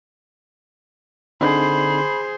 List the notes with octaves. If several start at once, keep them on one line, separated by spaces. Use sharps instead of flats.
D3 C4 D4 D#4 G#4 C5 B5